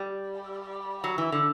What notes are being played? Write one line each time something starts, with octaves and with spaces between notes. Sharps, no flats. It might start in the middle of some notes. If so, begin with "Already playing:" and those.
Already playing: G3
F#3
E3
D3